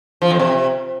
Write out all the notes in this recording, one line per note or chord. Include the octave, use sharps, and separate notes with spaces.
F3
F2
C3